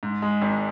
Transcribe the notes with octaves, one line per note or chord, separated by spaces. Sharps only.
G#2
G#3
G#1